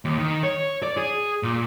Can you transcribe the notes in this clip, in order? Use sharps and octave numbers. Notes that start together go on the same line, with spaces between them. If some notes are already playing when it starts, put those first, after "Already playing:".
D#2
D#3
C#5
D5
G#4
A#2